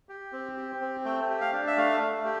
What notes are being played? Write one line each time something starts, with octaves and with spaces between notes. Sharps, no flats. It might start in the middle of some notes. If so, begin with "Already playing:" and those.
G4
C4
G4
C4
A3 G5
G4
F5
D4
E5
A3 F5
A3
G4